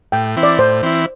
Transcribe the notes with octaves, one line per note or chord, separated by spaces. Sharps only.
A2 G5
E3 C4 E4
D5
A2 C5
E3 C4 E4